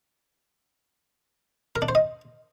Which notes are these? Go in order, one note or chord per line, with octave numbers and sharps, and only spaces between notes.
A#4
D4
C5
D#5